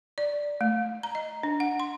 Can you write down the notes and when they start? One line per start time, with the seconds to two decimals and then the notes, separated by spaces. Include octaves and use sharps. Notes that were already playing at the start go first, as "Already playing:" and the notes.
0.18 D5
0.61 A3
1.03 A#5
1.15 D#5
1.43 D4
1.60 F#5
1.80 C6